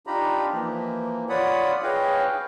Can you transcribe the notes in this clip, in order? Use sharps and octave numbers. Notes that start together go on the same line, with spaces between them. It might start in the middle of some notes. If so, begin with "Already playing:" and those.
D4 D#4 F4 G4 A#5 B5
E3 F3 A#3
F4 C#5 D5 F#5 B5 D#6
G#4 B4 C#5 D#5 F5 G5